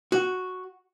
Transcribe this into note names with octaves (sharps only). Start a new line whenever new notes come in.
F#4